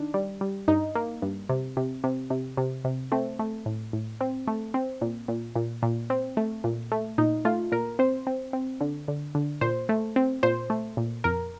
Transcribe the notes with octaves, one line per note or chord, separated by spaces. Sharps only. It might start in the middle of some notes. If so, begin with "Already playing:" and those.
Already playing: D#3 D4
G3
G3
G2 D#4
A#3
G2
C3
C3
C3
C3
C3
C3
A3 C4
A3
A2
A2
C4
A3
C4
A#2
A#2
A#2
A#2
C4
A3
A#2
A3
A#2 D#4
A3 F4
A#2 A#4
C4 C5
C4
C4
D3
D3
D3
A#2 C5
A3
C4
A#2 C5
A3
A#2
F2 A#4